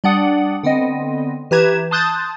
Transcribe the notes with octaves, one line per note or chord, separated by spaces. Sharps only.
G3 D4 D5 F#5 D#6
D3 B3 C4 D#5
E3 G4 B4 A#5 G#6 E7
A5 C6 D#6 F#6 G6 A6